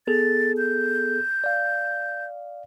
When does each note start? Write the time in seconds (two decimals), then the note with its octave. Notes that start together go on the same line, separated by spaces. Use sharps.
0.07 B3 G#4 A4 A6
0.58 G6
1.44 D5 F5